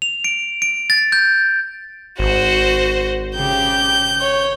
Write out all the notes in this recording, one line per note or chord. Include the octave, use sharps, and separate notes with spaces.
F7
D7
D7
A6
G6
G#1 F#4 C5
C#3 G4 G6
C#5